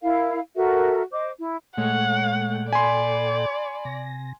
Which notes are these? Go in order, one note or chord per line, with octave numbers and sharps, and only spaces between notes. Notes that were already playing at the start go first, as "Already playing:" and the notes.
E4 A#4 F5
F#4 A4 A#4 E5
C5 D#5 D6
E4
A#2 G#3 A3 A4 C#5 F#5 G5
D5 G#5 B5 C6
C3 A#6